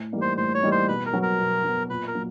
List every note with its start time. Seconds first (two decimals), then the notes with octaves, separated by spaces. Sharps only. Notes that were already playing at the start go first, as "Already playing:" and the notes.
Already playing: A2
0.12 E3 G3 A#3 D#4
0.21 C5
0.37 A2 C5
0.54 C#5
0.63 E3 G3 A#3 D#4
0.72 C5
0.88 B2 B4
1.06 A#4
1.13 F#3 B3
1.22 A#4
1.39 B2
1.64 F#3 B3
1.90 A#2 B4
2.07 A#4
2.15 F#3 A#3